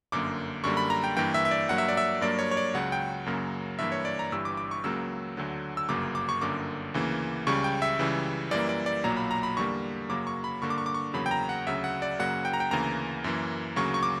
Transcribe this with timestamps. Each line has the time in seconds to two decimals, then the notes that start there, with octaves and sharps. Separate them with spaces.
0.12 G1 F#2 D3 A#3 D6
0.64 F#2 D3 G3 A#3 C#6
0.77 B5
0.90 A#5
1.04 G5
1.17 G2 E3 A#3 G5
1.34 E5
1.45 E5
1.51 D5
1.69 G2 F#3 A#3 F#5
1.78 E5
1.88 D5
1.97 E5
2.21 G2 F#3 A#3 D5
2.39 C#5
2.51 C#5
2.57 D5
2.74 C#2 C#3 F#3 F#5
2.92 G5
3.26 F#2 C#3 F#3 A#3
3.79 G2 E3 A#3 E5
3.92 C#5
4.05 D5
4.19 A#5
4.32 G1 G2 E3 G3 E6
4.45 D6
4.57 D6
4.71 C#6
4.84 C#2 C#3 F#3 A#3 E6
5.37 D2 D3 F#3
5.77 E6
5.89 G1 F#2 C#3 F#3 A#3 D6
6.15 D6
6.29 C#6
6.41 G1 F#2 D3 A#3 D6
6.94 D2 C#3 E3 A#3
7.47 C#2 C#3 G3 C#6
7.64 G5
7.82 E5
7.99 C#2 C#3 E3 G3
8.51 F#2 E3 G3 A#3 D5
8.69 D5
8.86 D5
9.04 B1 A#2 F#3 A#3 A#5
9.17 B5
9.31 A#5
9.43 B5
9.57 E2 D3 G3 A#3 C#6
10.09 F#2 C#3 F#3 A#3 D6
10.27 C#6
10.44 B5
10.62 G2 D3 A#3 C#6
10.70 D6
10.78 C#6
10.86 D6
10.94 C#6
11.14 E2 C#3 F#3 A#3 B5
11.26 G5
11.31 A#5
11.49 F#5
11.67 D2 C#3 F#3 E5
11.84 F#5
12.02 D5
12.19 F#2 C#3 F#3 A#3 F#5
12.45 G5
12.54 A#5
12.60 G5
12.71 D2 C#3 E3 A#3 A#5
13.24 F#2 E3 A#3
13.76 D2 C#3 F#3 A#3 C#6
13.94 C#6
14.03 D6